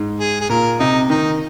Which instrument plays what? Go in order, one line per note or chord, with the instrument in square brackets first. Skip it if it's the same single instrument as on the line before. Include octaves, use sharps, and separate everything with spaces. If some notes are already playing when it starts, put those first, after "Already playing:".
Already playing: [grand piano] G#2
[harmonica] G#4
G#4
[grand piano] A#2 [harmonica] A#4
[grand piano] C3 [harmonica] D#4
[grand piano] D#3 [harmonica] D#4